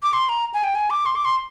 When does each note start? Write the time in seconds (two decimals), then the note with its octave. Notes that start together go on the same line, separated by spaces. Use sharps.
0.03 D6
0.13 C6
0.29 A#5
0.54 G#5
0.64 G5
0.75 G#5
0.90 D6
1.06 C6
1.16 D6
1.25 C6